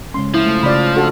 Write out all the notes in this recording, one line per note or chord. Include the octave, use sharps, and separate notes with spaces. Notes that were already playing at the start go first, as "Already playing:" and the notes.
C#3 G#3 C#4 C6
F3 E4
A3
C#3 C#4 F4 D5 B5
D4 F#4 A4